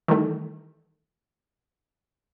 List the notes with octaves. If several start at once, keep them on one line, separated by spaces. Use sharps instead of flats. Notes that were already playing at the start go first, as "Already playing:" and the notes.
D#3 E3 G3 A3